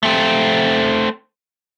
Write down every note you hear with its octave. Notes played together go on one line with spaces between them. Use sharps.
A3 C4